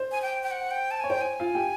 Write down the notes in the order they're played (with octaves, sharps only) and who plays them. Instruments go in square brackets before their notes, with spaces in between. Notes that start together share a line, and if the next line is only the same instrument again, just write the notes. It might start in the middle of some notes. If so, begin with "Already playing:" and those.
Already playing: [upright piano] C5
[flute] G#5
G5
G5
F#5
G5
A5
[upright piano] C#5 [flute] G#5
[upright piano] C5 [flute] G5
[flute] G#5
[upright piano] F4 F5
G4 G5